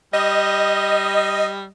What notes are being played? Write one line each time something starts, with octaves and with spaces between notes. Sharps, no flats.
G3 D#5